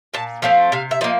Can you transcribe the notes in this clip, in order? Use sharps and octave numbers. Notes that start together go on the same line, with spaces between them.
A#2 A5
F3 A3 C4 F5
C3 F5
E5
F3 A#3 D#5